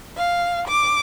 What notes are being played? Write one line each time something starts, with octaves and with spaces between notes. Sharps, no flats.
F5
D6